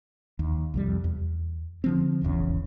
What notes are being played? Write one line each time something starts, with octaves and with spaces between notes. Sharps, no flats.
D#2
C2 F2 G3
E2
D3 F3 C4
D#1 G#1 E2 C#3